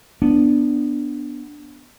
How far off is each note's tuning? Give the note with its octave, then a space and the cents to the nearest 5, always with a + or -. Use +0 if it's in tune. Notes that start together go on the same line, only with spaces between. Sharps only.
B3 +0 D4 +0